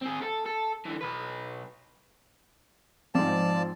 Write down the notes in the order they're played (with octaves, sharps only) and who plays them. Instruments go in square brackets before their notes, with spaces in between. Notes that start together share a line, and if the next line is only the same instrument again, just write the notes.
[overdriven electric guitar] C4 G#4
A4
A4
D3 E3
B1 B4
[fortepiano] G#2 C4 [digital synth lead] F3 [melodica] D5 A5